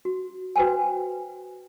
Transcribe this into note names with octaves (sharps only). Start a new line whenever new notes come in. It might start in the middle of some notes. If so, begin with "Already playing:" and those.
F#4
F#4 B4 C5 G5 G#5